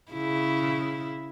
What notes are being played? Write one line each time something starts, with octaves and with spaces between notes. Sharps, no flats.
C#3 E4